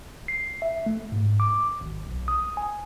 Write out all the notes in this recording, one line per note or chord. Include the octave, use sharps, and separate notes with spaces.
C7
E5
A3
G#2
D6
G#1
B1
D#6
G#5